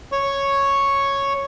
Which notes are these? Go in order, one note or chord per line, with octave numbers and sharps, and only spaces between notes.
C#5 C#6